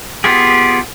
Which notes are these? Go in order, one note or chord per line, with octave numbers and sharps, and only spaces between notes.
B3 F4 G4 G#4